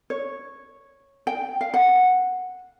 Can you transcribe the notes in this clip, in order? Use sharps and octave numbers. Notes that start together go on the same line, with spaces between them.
C#5
G5
F5
F#5